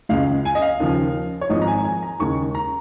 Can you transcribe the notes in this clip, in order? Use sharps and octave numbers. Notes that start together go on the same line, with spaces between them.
C#2 C#3 G#3 F5
G#5
D#5
F5
D#2 C#3 F3
C#5
G#1 G#2 F3 G#3 D#5
A#5
G#5
G#5
A#5
D#2 C#3 G#3 C#6
A#5